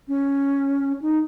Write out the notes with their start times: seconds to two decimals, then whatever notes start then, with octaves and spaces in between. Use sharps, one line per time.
0.08 C#4
1.02 D#4